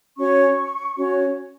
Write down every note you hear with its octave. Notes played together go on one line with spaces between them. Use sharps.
C#4 F#4 C#5 C#6
C#4 F#4 C#5